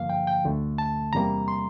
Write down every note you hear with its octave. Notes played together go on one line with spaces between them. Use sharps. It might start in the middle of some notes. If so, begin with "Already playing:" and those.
Already playing: G2 D3 F3 A#3 F5
G5
G5
D2 D3 A3
A5
E2 C3 G3 A#3 A#5
C6